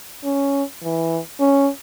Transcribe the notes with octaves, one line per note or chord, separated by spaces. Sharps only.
C#4
E3
C#4